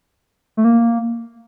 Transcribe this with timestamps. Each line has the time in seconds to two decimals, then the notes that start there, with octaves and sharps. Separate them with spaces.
0.57 A3
0.64 A#3